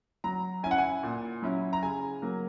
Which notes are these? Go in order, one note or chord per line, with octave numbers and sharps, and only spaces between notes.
F#3 A#5
C#4 E4 G#5
F#5
G#5
A#2
F#3 C#4 E4
A#5
C#3 G#5
F#3 A#3